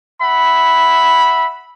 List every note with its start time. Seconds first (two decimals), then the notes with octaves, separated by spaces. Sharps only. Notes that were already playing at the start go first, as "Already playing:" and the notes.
0.22 E5 F#5 B5